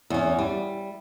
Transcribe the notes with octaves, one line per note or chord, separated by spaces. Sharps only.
E2 C#4
G3